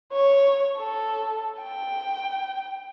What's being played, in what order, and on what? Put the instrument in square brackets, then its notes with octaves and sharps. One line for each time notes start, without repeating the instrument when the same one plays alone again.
[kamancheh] C#5
A4
G5